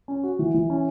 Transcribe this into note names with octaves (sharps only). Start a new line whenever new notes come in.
C#4
F#4
E3
E3
C#4